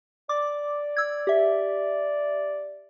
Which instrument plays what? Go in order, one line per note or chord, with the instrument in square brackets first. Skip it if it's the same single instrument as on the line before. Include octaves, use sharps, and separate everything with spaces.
[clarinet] D5 [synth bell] D6
[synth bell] E6 G#6
G4 E5